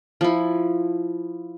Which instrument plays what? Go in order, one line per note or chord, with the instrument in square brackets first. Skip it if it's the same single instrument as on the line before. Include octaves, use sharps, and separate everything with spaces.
[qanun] F3 E4